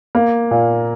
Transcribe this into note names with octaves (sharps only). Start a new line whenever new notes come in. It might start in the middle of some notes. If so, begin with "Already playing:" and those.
A#3
A#2